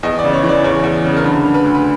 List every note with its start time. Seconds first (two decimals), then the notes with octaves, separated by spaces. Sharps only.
0.03 E2 D#5
0.19 D5
0.24 C#3
0.33 C#5
0.43 E3
0.49 D5
0.64 E2 C#5
0.84 E2
1.05 C#3
1.17 A#4
1.24 D3 B4
1.44 D3
1.54 B4
1.64 D2
1.75 B4